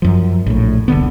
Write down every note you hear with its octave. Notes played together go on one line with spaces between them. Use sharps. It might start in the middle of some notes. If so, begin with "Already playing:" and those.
F#2 F3
A#1 A2
E1 C2 D3 B3